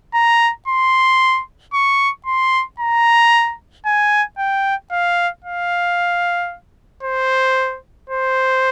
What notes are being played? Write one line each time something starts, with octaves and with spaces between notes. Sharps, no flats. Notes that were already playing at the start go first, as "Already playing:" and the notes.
A#5
C6
C#6
C6
A#5
G#5
G5
F5
F5
C5
C5